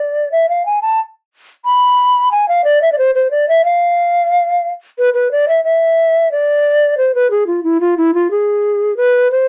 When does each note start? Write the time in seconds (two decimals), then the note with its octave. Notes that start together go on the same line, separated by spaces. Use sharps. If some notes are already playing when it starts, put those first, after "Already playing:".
Already playing: D5
0.32 E5
0.49 F5
0.66 G#5
0.82 A5
1.65 B5
2.32 G#5
2.48 F5
2.64 D5
2.82 E5
2.92 D5
2.98 C5
3.15 C5
3.31 D5
3.49 E5
3.65 F5
4.98 B4
5.14 B4
5.31 D5
5.48 E5
5.64 E5
6.31 D5
6.98 C5
7.15 B4
7.31 G#4
7.47 F4
7.63 E4
7.81 F4
7.98 E4
8.14 F4
8.31 G#4
8.97 B4
9.31 C5